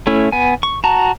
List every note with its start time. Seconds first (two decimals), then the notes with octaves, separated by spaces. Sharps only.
0.07 A3 C#4 E4
0.32 B3 G#5
0.63 C#6
0.84 F#4 A5 A#5